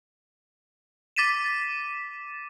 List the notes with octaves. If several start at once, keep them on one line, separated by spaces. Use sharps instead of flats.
D6 A6 B6 D#7 E7